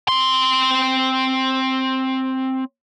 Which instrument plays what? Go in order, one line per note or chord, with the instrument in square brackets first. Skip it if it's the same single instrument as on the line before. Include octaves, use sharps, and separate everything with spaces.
[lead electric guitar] C4 C6